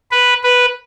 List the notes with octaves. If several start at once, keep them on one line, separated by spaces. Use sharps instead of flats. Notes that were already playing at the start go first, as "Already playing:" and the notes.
B4
B4